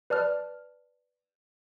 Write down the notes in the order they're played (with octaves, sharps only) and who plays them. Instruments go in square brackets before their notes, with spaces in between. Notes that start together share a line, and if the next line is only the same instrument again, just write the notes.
[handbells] B4 D5 A5 F6